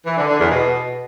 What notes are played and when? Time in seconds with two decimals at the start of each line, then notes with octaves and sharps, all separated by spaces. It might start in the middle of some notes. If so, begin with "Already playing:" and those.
0.06 E3
0.17 D3
0.28 D3
0.39 E2
0.50 B2